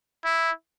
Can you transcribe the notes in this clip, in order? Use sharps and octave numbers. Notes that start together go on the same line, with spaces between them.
E4